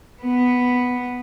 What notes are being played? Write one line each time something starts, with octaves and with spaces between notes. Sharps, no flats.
B3